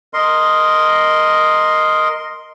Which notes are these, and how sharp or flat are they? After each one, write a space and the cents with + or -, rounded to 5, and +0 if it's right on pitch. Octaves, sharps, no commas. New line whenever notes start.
A#4 +0 D#5 +0 C6 +0